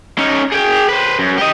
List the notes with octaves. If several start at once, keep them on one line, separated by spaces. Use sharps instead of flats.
C#4 D#4
G#4 G5
B4 C5
F#2
G4 D#5